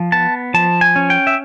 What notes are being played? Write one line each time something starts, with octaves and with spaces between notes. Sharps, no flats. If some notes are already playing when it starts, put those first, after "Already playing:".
Already playing: F3
B3 A5
F3 A5
G#5
C#4
G5
E5